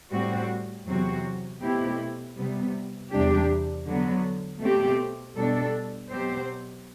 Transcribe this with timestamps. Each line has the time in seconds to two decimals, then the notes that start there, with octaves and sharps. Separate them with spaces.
0.12 A2 G3 C4 F#4
0.87 E2 C3 F#3 C4 F#4
1.61 B2 A3 C4 E4 G4
2.36 C3 G3 B3
3.11 E2 C3 G3 D4 G4
3.85 D3 F#3 B3
4.61 B2 A3 C4 G4
5.36 B2 G3 D4 A4
6.10 B2 F#3 C4 G4 C5